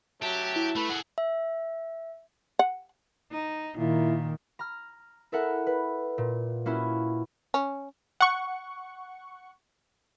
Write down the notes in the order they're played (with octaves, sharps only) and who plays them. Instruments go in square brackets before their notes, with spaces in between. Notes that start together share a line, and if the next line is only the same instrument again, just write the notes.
[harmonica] F#3 E5 A5 [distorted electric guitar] G4
[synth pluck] E4
[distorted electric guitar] A3 [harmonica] B4
[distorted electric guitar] G#4 A4 [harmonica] F#5
[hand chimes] E5
[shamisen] F#5
[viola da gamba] D#4
[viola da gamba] A#2 [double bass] D#3 [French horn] E4
[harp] A#5 F6
E4 A4 A#4 E5 F#5
B4
A#2
A#3 C#4 E4 F#4
[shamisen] C#4
[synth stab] F#5 C#6